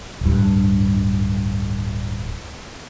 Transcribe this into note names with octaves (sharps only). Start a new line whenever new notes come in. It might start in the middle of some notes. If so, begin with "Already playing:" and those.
D1 G2